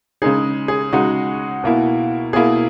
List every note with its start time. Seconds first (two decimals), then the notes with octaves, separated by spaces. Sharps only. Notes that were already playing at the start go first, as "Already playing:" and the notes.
0.22 C#3 G#3 D#4 G#4
0.68 G#4
0.93 C#3 G#3 D#4 F#4
1.64 B2 A#3 E4
2.33 B2 A#3 E4 G#4